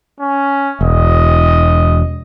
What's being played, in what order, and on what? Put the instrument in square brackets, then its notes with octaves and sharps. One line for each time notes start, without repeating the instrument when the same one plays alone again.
[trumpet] C#4
[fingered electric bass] E1 [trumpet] D#5